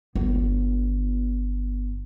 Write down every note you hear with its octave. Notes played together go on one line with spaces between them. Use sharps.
G1 B3